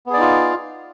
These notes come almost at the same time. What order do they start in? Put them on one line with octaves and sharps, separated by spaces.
B3 G#4 D5 D#4 F4